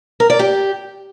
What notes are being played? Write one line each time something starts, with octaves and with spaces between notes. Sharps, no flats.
A#4
D5
G4